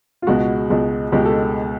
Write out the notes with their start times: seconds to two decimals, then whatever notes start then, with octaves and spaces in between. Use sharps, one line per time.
0.22 F4
0.27 C#2 B2 G#3 F#4
0.70 C#2 B2 G#3
1.12 C#2 B2 G#3 G4
1.25 A4